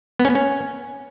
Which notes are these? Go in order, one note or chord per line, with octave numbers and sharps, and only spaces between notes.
B3
C#4
B3
C#4